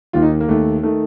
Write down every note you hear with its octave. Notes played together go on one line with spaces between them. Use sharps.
D#2 D#3 F4
D#4
A#3
D#2 D#3 A3
D#3 A3